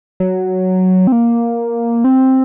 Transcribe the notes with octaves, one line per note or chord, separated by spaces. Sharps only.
F#3
C4
A#3
C4